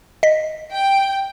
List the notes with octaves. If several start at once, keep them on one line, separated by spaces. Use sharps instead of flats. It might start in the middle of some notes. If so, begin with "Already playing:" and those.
D#5 B6
G5